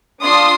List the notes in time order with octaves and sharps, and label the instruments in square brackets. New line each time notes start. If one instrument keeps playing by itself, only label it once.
[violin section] D4 F4 C6 D#6